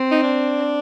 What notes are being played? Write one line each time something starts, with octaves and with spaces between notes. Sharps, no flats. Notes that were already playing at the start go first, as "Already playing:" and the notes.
Already playing: C4
D#4
D4